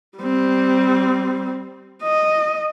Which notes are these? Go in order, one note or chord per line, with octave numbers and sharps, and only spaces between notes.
G3 C4
D#5